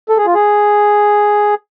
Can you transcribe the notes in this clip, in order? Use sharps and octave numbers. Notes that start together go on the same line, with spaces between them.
A4
G#4
F4
G#4